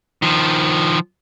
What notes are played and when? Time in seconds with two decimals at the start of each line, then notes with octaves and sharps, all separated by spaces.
0.22 D#3 F3